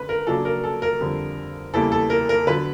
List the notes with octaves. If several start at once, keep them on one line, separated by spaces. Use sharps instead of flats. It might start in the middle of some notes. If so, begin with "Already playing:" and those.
Already playing: D3 G#3 C#4 B4
A#4
C#3 F#3 A#3 D4 A4
A#4
A4
A#4
F2 D3 G3
E2 C#3 E3 G3 A#3 A4
A4
A#4
A#4
D3 F#3 B3 B4